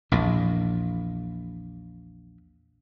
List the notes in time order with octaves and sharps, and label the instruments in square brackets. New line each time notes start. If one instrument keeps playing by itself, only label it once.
[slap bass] A#1 E2 A#2